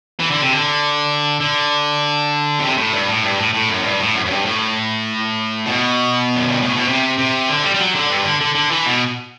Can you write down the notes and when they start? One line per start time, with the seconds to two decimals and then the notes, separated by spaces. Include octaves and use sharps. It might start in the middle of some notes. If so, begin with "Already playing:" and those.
0.20 E3
0.30 D3
0.42 C3
0.52 D3
1.40 D3
2.59 B2
2.63 C3
2.77 A2
2.93 G2
3.07 A2
3.24 G2
3.38 A2
3.54 A2
3.69 F#2
3.79 A2
3.84 G2
3.99 A2
4.15 F#2
4.25 F#2
4.30 G2
4.45 A2
5.66 B2
6.36 F#2
6.49 G2
6.62 A2
6.76 B2
6.88 C3
7.18 C3
7.49 D3
7.64 G3
7.74 G3
7.80 F#3
7.95 D3
8.10 G2
8.24 D3
8.41 D3
8.55 D3
8.71 E3
8.86 B2